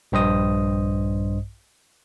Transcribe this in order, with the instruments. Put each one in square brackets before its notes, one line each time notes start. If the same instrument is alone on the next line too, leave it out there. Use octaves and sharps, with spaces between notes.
[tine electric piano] A#1 G2 C5 D#5 D#6